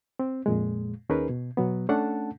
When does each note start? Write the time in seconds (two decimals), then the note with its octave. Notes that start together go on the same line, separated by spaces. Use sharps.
0.19 C4
0.46 F2 A#2 G#3
1.09 D#2 C#4 D#4 G#4 A#4 B4
1.29 B2
1.57 B2 F#3 B3
1.89 A3 C#4 D4 A4 F#5 A5